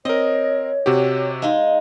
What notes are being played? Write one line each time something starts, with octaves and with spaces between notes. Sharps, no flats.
C4 A#4 C#5 D#5
C3 F#4 G4
G#3 D#4 F5